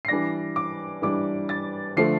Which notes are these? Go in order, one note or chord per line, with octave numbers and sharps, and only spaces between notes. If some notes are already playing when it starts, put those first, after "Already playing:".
C7
E3 G3 D4 A#6
D6
E3 G3 D4 D6
A6
D3 F3 A3 C7